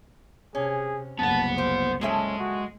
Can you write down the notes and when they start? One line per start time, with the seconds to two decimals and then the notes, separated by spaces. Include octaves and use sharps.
0.55 C3 C#4 G#4
1.19 F#1 C2 B3 F#5 A5
1.58 A#3 C5
2.01 F3 G#3 C#4 A4 E5
2.39 F#4